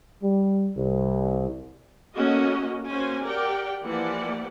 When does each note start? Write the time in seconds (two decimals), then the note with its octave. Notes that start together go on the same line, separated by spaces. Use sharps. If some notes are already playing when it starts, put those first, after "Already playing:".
0.23 G3
0.77 C2
2.16 A3 A#3 C#4 F#4 A#4 D#5
2.87 A#3 C#4 F#4 C5 G#5
3.24 G4 A#4 D5 F#5 G5
3.84 E3 F3 A#3 G4 D5 F#5